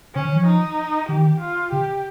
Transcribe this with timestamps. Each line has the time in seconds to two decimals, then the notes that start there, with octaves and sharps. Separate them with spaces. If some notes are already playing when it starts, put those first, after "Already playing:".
0.14 C#3 C#4
0.25 D#3
0.36 F3
0.46 D#4
1.08 D#3 G4
1.40 F4
1.71 C#3 G4